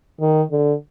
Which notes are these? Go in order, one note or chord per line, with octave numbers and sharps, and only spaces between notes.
D#3
D3